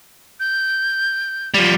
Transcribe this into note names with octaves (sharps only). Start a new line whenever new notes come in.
G6
F3 G3